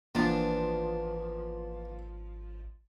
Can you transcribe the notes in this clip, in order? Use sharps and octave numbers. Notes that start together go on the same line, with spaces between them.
G#1 E3 F3 A#3 B3 D4 F4